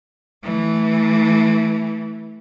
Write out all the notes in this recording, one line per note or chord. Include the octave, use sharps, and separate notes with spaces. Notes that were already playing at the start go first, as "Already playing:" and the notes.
E3 A3